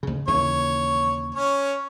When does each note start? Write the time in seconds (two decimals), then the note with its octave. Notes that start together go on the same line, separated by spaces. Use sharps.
0.03 D2 C#3
0.28 D#2 C#3 E3 C#5
1.34 C#4 C#5